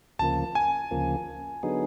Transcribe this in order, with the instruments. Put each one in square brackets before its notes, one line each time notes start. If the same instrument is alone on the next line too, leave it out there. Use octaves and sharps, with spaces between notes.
[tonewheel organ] D2 C#3 F3 A#3 [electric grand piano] A5
[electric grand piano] G#5
[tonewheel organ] D2 C#3 F3 A#3
D3 F#3 B3 D#4 G#4